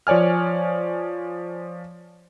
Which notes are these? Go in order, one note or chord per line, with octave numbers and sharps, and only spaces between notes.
F3 C#5 D5 G#5 F6